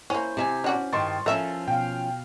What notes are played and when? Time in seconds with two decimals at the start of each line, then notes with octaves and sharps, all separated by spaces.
0.10 A#3 C#4 E4 C5
0.37 C3 C5 E5 G#5
0.64 C#4 D4 F#4 D5
0.93 G2 D#3 C6 C#6 A6
1.26 F3 C#4 A4 A#4 E5
1.68 B2 F5 G5